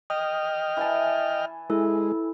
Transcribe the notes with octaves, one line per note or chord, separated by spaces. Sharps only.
D#5 G5 D#6 F6
E3 G#5 A5
G#3 E4 A4